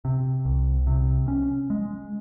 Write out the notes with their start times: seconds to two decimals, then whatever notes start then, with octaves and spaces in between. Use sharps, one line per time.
0.05 C3
0.45 C2
0.87 C3
1.28 C#4
1.70 G#3